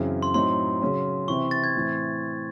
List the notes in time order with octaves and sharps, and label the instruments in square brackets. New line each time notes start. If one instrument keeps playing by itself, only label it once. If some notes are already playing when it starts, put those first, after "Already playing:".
Already playing: [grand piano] F#2 C#3 E3 C4
[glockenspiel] C6
[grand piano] A2 F#3 C4 D#4 [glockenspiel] C6
[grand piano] C#3 F#3 C#4
[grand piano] C3 E3 C4 [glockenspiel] C#6
[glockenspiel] A6
G#6
[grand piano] A2 E3 C4